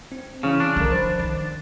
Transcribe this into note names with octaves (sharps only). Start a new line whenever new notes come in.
C4
C#3 E3 C#4 C#6
D4
G#1 D3 F3 A#4
C5 B5
D#3 A6